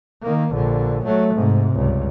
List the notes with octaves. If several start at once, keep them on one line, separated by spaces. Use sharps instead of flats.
D#3 A#3
A#1 D3
F#3 A3
G#2 C3
C#2 G2